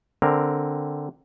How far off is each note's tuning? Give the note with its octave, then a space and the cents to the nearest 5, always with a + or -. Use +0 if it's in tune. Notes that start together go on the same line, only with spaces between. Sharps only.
D3 +0 C4 +0 A#4 +0